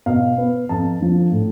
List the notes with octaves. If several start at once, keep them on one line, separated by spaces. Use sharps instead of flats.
B2 F5
B3
F2 A5
D3 F3
A2